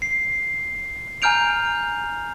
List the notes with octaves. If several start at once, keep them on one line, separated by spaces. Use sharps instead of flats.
C7
G#5 A#5 F6 G6 D7 F7